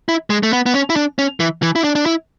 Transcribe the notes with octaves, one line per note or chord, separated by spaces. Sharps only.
E4
G#3
A3
B3
B3
C#4
E4
D4
C#4
E3
E3
E4
D4
D4
E4